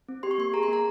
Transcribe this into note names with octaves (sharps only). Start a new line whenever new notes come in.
C4
G4 C6
C#6
A#3 C6
G#4 A#5
C6
A#3 A#5